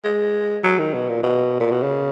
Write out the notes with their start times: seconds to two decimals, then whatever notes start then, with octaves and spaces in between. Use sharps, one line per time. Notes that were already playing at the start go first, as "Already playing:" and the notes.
0.04 G#3
0.64 F#3
0.79 D#3
0.94 B2
1.09 A#2
1.23 B2
1.60 A#2
1.71 B2
1.83 C#3